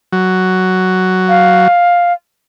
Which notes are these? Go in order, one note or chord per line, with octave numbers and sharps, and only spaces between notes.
F#3
F5